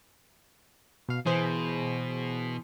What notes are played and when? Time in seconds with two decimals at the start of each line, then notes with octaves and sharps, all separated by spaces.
1.09 B2 F5
1.26 B2 E3 G#4 C5